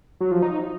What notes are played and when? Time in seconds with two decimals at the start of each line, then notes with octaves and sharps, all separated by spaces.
0.21 F#3
0.31 F3
0.42 D#4